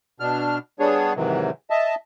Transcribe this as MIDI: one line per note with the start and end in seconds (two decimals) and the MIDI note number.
0.20 0.58 47
0.20 0.58 62
0.20 0.58 89
0.80 1.13 55
0.80 1.13 59
0.80 1.13 62
0.80 1.13 68
0.80 1.13 73
1.15 1.50 44
1.15 1.50 48
1.15 1.50 51
1.15 1.50 52
1.15 1.50 54
1.70 1.95 75
1.70 1.95 76
1.70 1.95 81